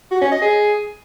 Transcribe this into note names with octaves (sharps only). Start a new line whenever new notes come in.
F#4
C#4
D#5
G#4